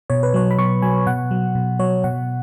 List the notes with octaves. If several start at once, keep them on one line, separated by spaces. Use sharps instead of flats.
B2 C#5
B4
F#3 C#5
B5
B2 C#6
F#3 G#5
B2 F#5
F#3
B2
F#3 C#5
B2 F#5